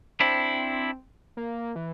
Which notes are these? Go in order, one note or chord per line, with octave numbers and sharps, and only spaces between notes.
C4 D4 E4
A#3
E3